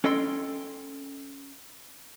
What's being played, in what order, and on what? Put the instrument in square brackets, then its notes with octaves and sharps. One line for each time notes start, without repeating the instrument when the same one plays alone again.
[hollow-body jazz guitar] C#4 A4 D#5 G5 C6